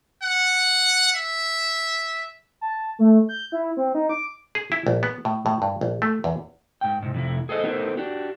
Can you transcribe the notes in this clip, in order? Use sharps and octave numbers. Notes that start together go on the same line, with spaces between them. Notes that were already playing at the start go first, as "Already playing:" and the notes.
F#5
E5
A5
A3
G6
E4
C4
D#4
D6
G#4
E4
A#1
B3
A2
A2
G2
A#1
A3
E2
G#2 G5
G#2 C3
F2 C3 E4
G#4 A4 C5 D#5
B3 D#4 E4 A4 A#4 C5
D4 F#4 G4